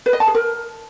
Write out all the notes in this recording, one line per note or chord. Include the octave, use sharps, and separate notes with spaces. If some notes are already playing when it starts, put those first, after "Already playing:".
B4
D#5
A5
G#4
A#4